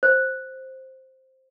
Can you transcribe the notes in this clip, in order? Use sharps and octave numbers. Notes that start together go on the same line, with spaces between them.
C5